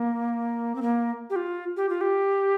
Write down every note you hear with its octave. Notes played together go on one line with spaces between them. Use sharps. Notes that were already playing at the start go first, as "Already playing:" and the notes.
Already playing: A#3
C4
A#3
G4
F4
G4
F4
G4